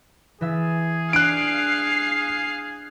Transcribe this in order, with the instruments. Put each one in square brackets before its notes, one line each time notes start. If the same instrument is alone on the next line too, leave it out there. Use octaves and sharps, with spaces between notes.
[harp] E3 E5 A6 [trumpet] G#4
[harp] D4 [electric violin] F5 C7 [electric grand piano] F#6 D7